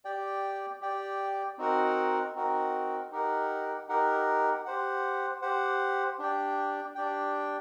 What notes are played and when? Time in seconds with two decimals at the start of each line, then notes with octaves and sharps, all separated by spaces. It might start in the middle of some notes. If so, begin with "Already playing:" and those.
0.05 G4 D5 G5
0.81 G4 D5 G5
1.58 C4 D#4 F#4 A#4 F#5
2.35 C4 D#4 F#4 A#4 F#5
3.12 D#4 G4 A#4 F#5
3.88 D#4 G4 A#4 F#5
4.65 G4 C5 F#5
5.42 G4 C5 F#5
6.19 D4 G4 D5 G5
6.95 D4 G4 D5 G5